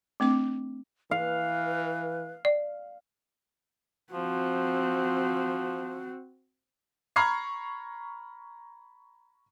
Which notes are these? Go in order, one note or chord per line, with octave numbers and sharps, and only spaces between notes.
A3 C4 D4 D6
E3 B4 F5
D5
F3 C4 F#4
A#5 B5 C#6 F6 G#6 C7